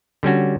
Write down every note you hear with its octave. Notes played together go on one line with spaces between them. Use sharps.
D3 G3 C#4 F#4